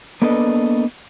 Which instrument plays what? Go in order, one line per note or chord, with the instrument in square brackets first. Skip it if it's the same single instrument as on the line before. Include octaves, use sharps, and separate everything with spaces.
[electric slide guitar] A#3 B3 D4 A4 B4 D#5